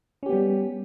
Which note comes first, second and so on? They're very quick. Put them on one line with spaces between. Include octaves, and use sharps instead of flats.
C#4 G4 B3 G3